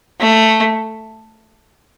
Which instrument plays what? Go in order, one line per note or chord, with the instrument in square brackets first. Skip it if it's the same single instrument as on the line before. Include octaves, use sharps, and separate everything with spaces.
[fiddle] A3